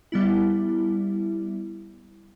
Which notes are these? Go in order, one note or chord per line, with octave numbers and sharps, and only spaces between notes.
G3 B3 E4